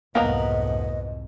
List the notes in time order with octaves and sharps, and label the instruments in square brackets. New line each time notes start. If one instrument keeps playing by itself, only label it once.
[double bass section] C2 F2 G#2 [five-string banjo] A#3 B3 A#5 [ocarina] D#5